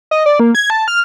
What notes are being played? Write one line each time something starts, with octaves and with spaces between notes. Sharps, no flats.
D#5
D5
A#3
G#6
A5
F6